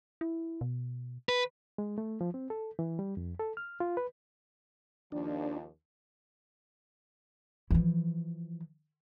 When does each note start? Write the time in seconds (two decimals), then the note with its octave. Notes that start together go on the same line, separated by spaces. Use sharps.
0.21 E4
0.61 B2
1.29 B4
1.78 G#3
1.98 A3
2.21 F3
2.34 C4
2.50 A4
2.79 E3
2.99 G3
3.17 F2
3.40 A4
3.57 F6
3.80 F4
3.97 B4
5.12 D#2 F3 D4
7.71 E3 F3